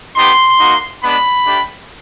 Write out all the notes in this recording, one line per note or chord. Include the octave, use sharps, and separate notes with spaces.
B3 D#4 G4 C6
A#3 D#4 F#4
G#3 B3 D4 B5
A3 D4 G4